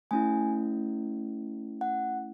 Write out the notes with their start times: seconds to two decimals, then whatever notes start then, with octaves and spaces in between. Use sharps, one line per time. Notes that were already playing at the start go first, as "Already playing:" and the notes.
0.11 A3 C#4 E4 G#5
1.81 F#5